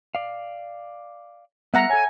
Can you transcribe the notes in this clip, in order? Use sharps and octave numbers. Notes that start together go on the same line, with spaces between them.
D5 F5
G3 B3 E5 F#5 A#5
A4 C#5 G#5